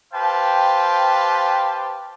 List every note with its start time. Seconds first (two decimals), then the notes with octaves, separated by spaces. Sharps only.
0.14 G4 B4 C5 F5 G5 A5